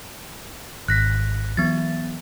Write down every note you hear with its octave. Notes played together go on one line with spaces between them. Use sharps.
G#1 F#6 A#6 B6
E3 F#3 B3 A6